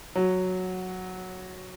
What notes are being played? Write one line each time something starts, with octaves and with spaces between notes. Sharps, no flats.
F#3